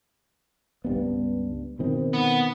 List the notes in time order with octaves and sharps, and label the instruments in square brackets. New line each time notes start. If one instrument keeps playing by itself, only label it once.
[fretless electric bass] C#2 G2 B3
B2 D#3 C4
[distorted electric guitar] B3